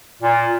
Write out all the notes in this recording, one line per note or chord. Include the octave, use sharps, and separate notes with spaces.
A#2